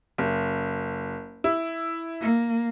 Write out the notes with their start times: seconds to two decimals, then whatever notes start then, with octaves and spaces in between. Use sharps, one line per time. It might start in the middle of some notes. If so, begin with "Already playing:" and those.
0.18 F#1
1.44 E4
2.20 A#3